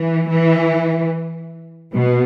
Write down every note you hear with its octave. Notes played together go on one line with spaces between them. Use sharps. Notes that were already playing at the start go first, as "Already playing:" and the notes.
Already playing: E3
E3
B2